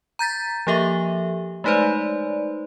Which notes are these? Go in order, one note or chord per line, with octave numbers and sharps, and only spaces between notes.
A#5 G6 A6 B6
F3 A#3 G4 A4 E5
G#3 A3 D#4 B4 C5 D5